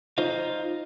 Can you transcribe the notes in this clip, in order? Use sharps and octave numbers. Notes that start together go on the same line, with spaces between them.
D#4 F4 C5 D#5 F5